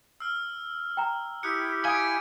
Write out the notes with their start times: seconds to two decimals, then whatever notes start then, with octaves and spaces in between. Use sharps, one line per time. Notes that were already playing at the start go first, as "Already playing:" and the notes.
0.20 E6 F6
0.97 G5 A#5
1.43 E4 G4 D#6 F#6 C#7
1.85 F5 G#5 D#6 G#6 D7